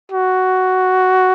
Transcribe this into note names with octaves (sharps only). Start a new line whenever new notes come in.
F#4